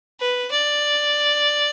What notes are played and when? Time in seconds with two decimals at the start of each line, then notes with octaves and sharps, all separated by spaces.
0.20 B4
0.51 D5